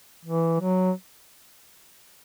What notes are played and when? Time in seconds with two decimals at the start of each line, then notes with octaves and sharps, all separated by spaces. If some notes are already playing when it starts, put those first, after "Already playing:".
0.25 E3
0.60 F#3